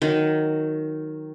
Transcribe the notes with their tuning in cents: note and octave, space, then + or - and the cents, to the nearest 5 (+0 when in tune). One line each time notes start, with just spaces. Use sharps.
D#3 +0 F#3 -10